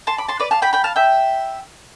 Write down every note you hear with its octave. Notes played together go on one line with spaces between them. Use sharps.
A5 C6
B5 D6
A5 C6
B4 D5
F5 A5
G5 B5
G5 B5
F5 A5
E5 G5